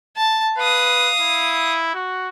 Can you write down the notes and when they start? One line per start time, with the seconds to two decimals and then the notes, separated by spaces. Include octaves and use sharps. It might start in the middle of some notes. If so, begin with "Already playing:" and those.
0.16 A5
0.58 B4 F5 D#6
1.21 E4
1.94 F#4